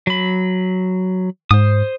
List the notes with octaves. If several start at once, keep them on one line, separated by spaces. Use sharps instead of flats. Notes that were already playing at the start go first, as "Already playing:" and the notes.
F#3 B5
G#2 C5 D#6